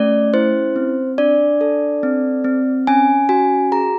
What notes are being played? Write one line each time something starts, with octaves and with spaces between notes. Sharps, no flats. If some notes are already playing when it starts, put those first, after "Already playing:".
Already playing: A3 C#4 D5
E4 C5
C4
D4 D5
A4
C4
C4
C#4 G#5
F#4 G#5
G#4 A#5